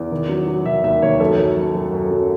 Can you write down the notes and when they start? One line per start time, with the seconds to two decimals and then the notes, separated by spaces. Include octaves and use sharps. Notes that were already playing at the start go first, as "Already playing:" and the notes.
Already playing: E2
0.12 D#3
0.29 F#3
0.47 F#3
0.65 D#3 E5
0.83 D#2 E5
1.02 D#2 C#5
1.20 F#2 A4
1.39 F#2
1.57 F#2
1.75 F#2
1.93 F#2
2.11 F#3